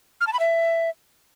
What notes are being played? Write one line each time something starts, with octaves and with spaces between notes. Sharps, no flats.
F6
A5
B5
E5